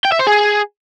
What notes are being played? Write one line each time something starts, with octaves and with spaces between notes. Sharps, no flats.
G5
E5
C5
G#4